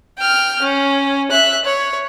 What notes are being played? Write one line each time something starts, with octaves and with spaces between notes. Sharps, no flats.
G5 F6
C#4
E5 F#6
C#5